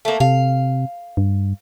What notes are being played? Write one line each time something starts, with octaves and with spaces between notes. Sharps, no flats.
A3 A#3
C3 F5
G2